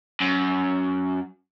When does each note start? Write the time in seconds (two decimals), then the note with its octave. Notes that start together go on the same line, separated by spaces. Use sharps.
0.20 F#2